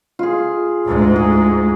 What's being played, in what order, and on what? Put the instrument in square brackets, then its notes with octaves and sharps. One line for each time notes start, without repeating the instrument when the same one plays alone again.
[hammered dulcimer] F4 G#4
[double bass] D2 G#2
[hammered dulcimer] G#4